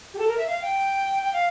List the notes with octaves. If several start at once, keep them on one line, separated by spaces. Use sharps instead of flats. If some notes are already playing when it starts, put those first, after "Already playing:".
G4
A4
A#4
E5
F5
G5
G5
F5